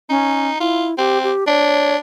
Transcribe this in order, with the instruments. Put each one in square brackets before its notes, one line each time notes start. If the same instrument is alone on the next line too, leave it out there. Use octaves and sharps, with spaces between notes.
[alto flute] C#4 [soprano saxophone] D#4
[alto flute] E4 [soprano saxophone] F4
[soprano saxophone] C4 [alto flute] G4
[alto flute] G4
[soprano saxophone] D4 [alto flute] C#5